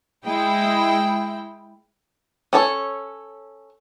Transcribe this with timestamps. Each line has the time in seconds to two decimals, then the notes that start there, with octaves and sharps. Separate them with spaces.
0.25 G#3 E4 G5
2.53 C#4 A4 C#5